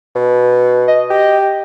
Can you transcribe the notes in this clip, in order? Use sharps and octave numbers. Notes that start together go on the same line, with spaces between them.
B2
D#5
G4